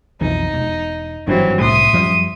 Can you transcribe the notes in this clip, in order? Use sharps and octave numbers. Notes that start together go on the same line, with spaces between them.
B1 F2 E3 D#4
E1
G#1 G2 E3 F#3 C4 D4
C2 A2 E5 C6 D#6
F#2 F3 G3